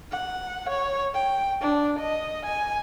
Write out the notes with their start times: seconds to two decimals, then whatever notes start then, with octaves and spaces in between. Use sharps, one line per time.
0.12 F#5
0.69 C#5
1.14 G5
1.61 D4
1.99 D#5
2.46 G#5